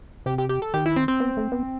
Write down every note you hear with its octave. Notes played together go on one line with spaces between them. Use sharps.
C3 G4
G4
G4
A4
D#3 G4
E4
C4
C4
B3
A3
B3